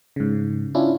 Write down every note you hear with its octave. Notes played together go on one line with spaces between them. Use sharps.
G#2 C#3
C#4 D4 E4 F4